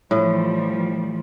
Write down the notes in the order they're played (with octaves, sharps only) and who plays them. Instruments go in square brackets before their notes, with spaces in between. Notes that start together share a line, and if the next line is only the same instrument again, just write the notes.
[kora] A2 [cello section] E3 F3 G3